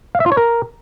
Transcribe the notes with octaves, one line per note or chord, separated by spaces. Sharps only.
F5
E5
F4
C#5
A#4